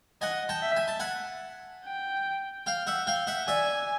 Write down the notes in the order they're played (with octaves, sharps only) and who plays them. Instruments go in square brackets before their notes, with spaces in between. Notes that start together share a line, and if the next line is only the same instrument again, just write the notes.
[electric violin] D#5 [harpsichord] F#5 G#5
[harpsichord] G5 A5
[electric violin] E5
[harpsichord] G#5
A5
F#5 G#5
[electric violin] G5
[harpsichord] F5 G5
E5 F#5
F5 G5
E5 F#5
[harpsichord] D5 E5 [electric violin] G#5